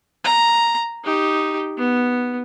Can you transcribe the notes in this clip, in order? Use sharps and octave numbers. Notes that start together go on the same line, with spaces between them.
A#5
D#4 G4
B3